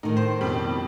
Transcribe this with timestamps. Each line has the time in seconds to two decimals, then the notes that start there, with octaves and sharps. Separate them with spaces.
0.03 A2 D#3 D#4
0.17 C5
0.41 F2 B2 G3